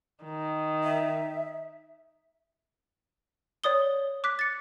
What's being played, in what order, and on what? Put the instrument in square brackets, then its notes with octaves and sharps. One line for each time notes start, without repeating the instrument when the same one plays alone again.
[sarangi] D#3
[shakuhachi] E5
[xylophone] C#5 D5 D#6 G7
D6 F#6 B6
A6 C#7